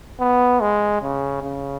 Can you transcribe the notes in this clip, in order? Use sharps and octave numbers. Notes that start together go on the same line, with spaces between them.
B3
G#3
C#3
C#3